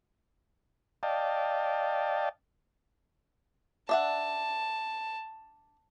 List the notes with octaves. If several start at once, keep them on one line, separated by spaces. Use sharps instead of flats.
D5 D#5 F5 G5 A5
D4 E5 F#5 A5